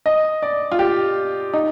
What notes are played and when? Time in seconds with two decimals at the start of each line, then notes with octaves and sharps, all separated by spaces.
0.06 D#5
0.42 D5
0.72 F4
0.79 G4
1.53 D#4